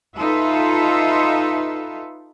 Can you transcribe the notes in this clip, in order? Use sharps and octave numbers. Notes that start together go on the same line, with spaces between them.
D#4 F4 A4 B4 E5